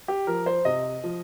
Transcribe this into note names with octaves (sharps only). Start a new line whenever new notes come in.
G4
F3 A#4
C5
C3 D#5
F3